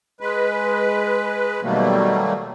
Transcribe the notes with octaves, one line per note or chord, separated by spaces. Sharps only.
G#3 B4
B2 D#3 F#3 G3 A3 A#3